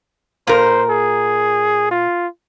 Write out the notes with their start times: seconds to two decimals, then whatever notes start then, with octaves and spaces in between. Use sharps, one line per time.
0.47 A#2 A#4 C5
0.90 G#4
1.91 F4